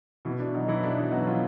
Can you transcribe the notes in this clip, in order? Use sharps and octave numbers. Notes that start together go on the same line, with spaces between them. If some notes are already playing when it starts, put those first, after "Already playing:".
B2 E3 E4
D4
F#3 D#4
E3 E4
B2 D4
D#4
F#3 B3 F#4
F3 F4